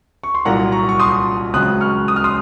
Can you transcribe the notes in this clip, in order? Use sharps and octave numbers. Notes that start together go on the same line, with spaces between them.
C#6
C6
C2 A#2 F#3 A#3 F#5 A#5
A#5 C#6
C#6
C6 D#6
C#2 C#3 F#3 C4 D#6 F#6
C#6 F6
D#6
F6
C6 D#6